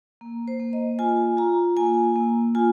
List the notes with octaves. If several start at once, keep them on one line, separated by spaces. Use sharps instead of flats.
A#3
C5
A#3
D#5
F4 G#5
F4 A#5
A#3 G#5
A#3
F4 G#5